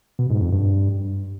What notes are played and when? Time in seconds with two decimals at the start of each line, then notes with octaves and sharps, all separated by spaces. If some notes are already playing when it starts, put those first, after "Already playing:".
0.19 B2
0.30 G#2
0.41 F2
0.52 G2